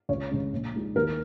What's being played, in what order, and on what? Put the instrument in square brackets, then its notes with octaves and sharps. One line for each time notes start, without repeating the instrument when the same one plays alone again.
[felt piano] C#2 C#5
C#3 G#3 C#4
A#1
A#2 G#3 D#4
D#2 A#4